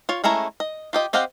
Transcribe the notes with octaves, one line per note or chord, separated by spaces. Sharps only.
F4 C#5
G#3 A3 C#4 E4 A#5
D#5
F4 G4 D#5
C4 G4 D#5 F5 F#5